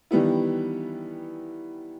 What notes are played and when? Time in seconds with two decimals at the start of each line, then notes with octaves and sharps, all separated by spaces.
0.11 D#3 E3 G3 B3 E4